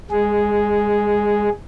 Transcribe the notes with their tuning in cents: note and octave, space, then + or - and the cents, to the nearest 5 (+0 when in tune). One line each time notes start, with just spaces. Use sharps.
G#3 -20 G#4 +0